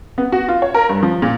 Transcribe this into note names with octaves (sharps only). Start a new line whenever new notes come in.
B3
F#4
F4
C#5
A#4
G2
F3
A#2